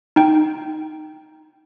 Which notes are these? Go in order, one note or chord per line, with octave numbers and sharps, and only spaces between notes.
D#4 G5